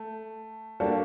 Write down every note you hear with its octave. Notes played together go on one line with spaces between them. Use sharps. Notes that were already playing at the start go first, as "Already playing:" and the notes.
Already playing: A3
G3 A#3 D4 F#4 A4